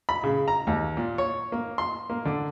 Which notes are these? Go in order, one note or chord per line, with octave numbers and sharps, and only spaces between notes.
B5
C#3
A#5
D#2
A#2
C#5
A#3
C6
A#3
D3